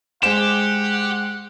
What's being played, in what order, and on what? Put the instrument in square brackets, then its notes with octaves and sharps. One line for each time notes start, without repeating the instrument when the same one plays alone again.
[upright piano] G#3 C5 [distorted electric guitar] G4 [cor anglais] F#5 [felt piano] E7